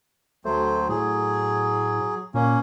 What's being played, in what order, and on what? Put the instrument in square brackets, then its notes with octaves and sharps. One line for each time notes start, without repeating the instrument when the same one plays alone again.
[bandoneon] D2 F#3 C5 [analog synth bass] A3
[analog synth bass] A2 [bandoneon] F#3 G#4
[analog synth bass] A#2 [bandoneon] A#3 C#4